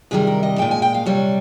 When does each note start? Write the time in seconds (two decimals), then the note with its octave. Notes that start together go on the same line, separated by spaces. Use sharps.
0.11 C3 D#3 G3 G#4
0.27 A#4
0.43 D#5
0.58 A#2 G#3 G5
0.71 G#5
0.82 G5
0.94 F5
1.06 C3 G3 C#5